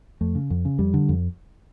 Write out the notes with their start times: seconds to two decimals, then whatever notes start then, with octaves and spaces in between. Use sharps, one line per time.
0.21 F2 A3
0.35 C#3
0.50 F2
0.65 C#3
0.79 F2 G3
0.94 D3
1.09 F2